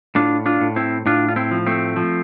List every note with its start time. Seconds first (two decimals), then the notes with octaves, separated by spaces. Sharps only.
0.15 A2 D4 F4
0.46 D4 F4
0.61 A2
0.76 C4 E4
1.06 A2 D4 F4
1.28 F4
1.36 C4 E4
1.51 F3
1.66 A3 C4
1.96 F3